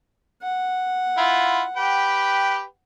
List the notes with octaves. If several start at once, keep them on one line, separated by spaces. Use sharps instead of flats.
F#5
E4 F4
G4 B4 G5